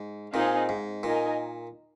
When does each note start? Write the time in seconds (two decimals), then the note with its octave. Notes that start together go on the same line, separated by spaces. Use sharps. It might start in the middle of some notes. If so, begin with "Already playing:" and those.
Already playing: G#2
0.34 A#2 C4 D#4 G#4 F5
0.69 G#2
1.03 A#2 D#4 A#4 D#5 G#5